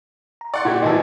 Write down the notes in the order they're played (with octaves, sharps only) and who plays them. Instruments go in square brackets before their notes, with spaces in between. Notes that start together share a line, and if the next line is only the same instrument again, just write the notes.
[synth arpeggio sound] A#5
[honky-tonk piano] D5 F#5 C6 [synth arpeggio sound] C#6
[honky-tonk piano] A#2 G4 [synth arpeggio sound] E4 F#5 G#6
[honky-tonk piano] G#1 A#2 E3 [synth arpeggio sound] D#5 G#5 A5